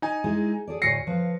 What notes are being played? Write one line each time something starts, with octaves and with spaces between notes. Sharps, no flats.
D#4 G#5
G#3 E4 G#4
G#4 A4 D5
D2 A2 G#5 A#6 C7 C#7
F3 B4 F5